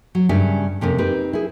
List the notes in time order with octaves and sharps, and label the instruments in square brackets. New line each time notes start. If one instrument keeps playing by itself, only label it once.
[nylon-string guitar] F#3
G2 C#3 G3 C#4 E5
F2 C3 A#3 C#4
C4 D#4 G4 B4
E4 G#4